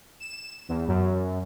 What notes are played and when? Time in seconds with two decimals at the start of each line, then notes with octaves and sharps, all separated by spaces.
0.20 E7
0.69 E2
0.88 F#2